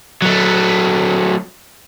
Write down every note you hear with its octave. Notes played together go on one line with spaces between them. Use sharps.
F#3 A3